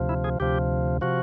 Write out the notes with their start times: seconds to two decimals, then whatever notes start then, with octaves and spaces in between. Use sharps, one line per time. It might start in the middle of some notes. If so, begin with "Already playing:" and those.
Already playing: D2 C3 F3
0.09 E4
0.24 G#4
0.40 D2 C3 F3 G4
1.01 C3 F3 F#4